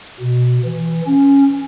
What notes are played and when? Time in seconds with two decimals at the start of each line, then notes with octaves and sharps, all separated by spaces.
0.20 B2
0.65 E3
1.06 C#4